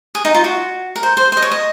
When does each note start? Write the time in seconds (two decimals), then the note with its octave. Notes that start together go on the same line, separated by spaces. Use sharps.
0.15 G#4
0.25 D#4
0.34 F4
0.44 F#4
0.96 A#4
1.03 C5
1.17 C5
1.32 C5
1.37 D#5
1.42 C#5
1.51 D#5